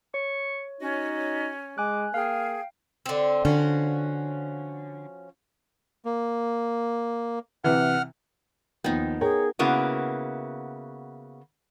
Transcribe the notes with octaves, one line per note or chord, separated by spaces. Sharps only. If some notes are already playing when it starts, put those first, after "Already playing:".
C#5 C#6
C#4 D#4 F#4
G#3 G#5 D6 F#6
A#3 G#4 F5 G5 F6
D3 C4
D3 F3 C#4 F#4
A#3
C3 E3 F#5 F6
D#2 F3 B3 D#4 G5
G#4 A#4 C#5 G5
C#3 A#3 B3 E4 F#4